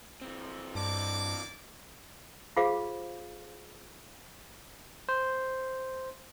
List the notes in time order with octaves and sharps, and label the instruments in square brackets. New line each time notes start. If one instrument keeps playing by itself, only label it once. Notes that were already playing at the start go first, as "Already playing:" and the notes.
[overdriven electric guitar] E3 C4
[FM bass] G2 [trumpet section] A#3 D5 D6 [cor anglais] D4
[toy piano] F4 G4 G#4 C5 F5 D6
[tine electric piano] C5